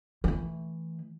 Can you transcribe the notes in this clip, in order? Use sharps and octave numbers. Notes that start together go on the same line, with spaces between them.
E3 A3